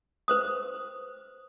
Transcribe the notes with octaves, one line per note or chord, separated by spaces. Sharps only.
B4 C5 D#6